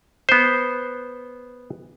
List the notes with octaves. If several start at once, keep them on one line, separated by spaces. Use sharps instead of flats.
B3 C5